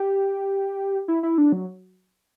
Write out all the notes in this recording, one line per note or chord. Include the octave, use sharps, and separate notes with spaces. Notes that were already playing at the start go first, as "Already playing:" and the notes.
Already playing: G4
E4
E4
D4
F#3